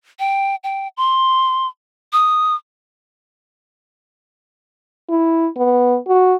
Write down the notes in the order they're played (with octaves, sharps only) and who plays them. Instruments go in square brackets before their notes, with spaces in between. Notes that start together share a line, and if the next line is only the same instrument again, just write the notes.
[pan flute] G5
G5
C6
D#6
[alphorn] E4
B3
F#4